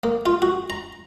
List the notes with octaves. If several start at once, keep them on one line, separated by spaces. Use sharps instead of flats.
A#3
F4
F#4
A#5